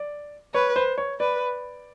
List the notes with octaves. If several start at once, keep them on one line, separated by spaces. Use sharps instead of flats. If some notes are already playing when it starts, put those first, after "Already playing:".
Already playing: D5
B4 C#5
C5
C#5
B4 D5